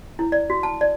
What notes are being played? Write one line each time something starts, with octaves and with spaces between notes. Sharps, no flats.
E4
D5
F#4
A5
D5